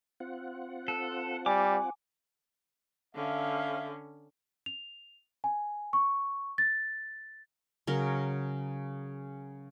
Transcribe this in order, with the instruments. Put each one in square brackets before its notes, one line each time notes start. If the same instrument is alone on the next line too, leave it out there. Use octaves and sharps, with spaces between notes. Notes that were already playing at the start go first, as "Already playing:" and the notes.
[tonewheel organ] C4 F4 F#5
[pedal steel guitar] A4
[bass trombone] G3 [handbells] G#5 [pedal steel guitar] D6
[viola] D3 C#4 [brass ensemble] E5 F5
[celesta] F7
G#5
C#6
A6
[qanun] C#3 F#3 A#4